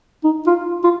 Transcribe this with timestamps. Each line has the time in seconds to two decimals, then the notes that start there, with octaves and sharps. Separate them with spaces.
0.24 D#4
0.47 F4
0.84 F4